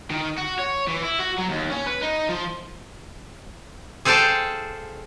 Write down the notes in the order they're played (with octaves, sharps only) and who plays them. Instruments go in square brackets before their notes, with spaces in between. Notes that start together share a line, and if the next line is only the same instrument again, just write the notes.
[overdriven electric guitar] D#3
F#4
C#5
E3
E4
F#4
F#3
D#2
C#4
B4
D#4
F3
[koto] G#4 A4 C5 F5 G5 A5